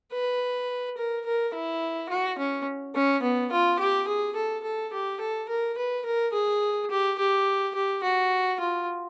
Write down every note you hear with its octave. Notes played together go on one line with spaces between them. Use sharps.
B4
A#4
A#4
E4
F#4
C#4
C#4
B3
F4
G4
G#4
A4
A4
G4
A4
A#4
B4
A#4
G#4
G4
G4
G4
F#4
F4